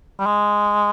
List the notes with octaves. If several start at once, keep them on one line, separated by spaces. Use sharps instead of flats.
G3
G#3